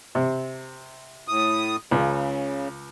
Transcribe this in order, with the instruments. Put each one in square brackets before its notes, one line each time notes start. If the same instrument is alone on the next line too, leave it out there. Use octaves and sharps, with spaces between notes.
[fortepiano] C3
[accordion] A2 D#6
[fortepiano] C#2 [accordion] C#3